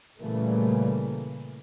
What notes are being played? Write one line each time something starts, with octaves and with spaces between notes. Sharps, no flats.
A#2 C#3 E3 G3 A3 A#3